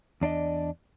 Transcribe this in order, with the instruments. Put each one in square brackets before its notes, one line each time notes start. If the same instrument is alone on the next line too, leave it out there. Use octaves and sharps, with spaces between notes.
[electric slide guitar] E2 D4 D5 D#5